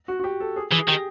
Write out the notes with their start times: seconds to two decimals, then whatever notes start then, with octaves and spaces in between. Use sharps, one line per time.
0.08 F#4
0.20 F#4
0.24 G4
0.40 A4
0.56 G#4
0.71 E3 G#4
0.88 D#3 G4